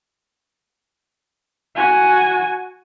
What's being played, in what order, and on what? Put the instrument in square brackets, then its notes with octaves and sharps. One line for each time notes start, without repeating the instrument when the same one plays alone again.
[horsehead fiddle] F#4 G#5